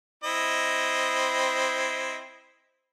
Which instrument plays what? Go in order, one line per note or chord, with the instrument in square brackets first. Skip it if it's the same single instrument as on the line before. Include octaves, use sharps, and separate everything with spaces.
[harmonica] C4 E4 D#5